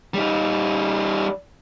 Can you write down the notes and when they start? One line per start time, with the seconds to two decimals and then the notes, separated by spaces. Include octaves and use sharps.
0.14 G3 D#4